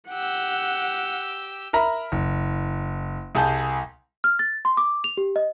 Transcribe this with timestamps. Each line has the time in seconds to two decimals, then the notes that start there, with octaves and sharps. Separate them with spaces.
0.10 G4 F#5 E6
1.73 A#4 E5 A#5 B5
2.12 F#1
3.35 C2 G#4 A5 G6
4.24 F6
4.39 A6
4.65 C6
4.77 D6
5.04 F7
5.17 G4
5.36 D#5